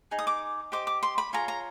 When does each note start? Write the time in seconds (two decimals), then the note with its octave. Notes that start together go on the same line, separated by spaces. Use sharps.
0.11 D#4 G#4
0.19 D#6
0.27 D6
0.72 G4 C5 D#5 D6
0.87 D6
1.03 C6
1.18 B5
1.33 F4 G#4 C#5 A#5
1.48 A#5